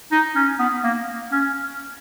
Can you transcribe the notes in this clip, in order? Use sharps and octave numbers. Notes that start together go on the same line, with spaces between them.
D#4
C#4
B3
A#3
C#4